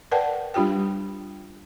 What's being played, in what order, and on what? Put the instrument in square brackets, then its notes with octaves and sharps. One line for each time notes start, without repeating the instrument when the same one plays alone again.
[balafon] A#4 B4 D5 F#5 G5 A5
G3 D4 F4 G4 G5